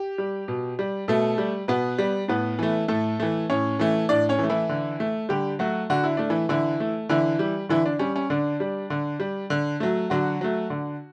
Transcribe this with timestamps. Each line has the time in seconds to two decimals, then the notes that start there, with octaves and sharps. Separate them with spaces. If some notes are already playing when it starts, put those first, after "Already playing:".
Already playing: G4
0.18 G3
0.48 B2
0.79 G3
1.08 B2 A3 A4
1.38 G3
1.68 B2 B3 B4
1.98 G3
2.28 A2 B3 B4
2.59 E3 A3
2.88 A2 A3 A4
3.20 E3 A3
3.50 A2 C#4 C#5
3.79 E3 A3
4.09 A2 D4 D5
4.29 C#4 C#5
4.39 E3
4.43 A3
4.50 E3 E4
4.69 D3
5.00 A3
5.29 D3 G3 G4
5.59 F#3 A3 F#4
5.90 D3 F#4
6.04 E4
6.17 A3 D4
6.30 E3 E4
6.49 D3 E3 E4
6.80 A3
7.09 D3 E3 E4
7.39 G3
7.69 D3 E3 E4
7.86 D4
7.99 G3 C#4
8.16 C#4
8.30 D3 D4
8.60 G3
8.90 D3
9.20 G3
9.50 D3
9.80 F#3 A3
10.10 D3 F#3 F#4
10.41 F#3 A3
10.70 D3